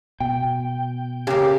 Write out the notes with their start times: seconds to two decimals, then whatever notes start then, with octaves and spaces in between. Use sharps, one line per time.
0.20 B2 G5
1.27 C#3 A#3 G4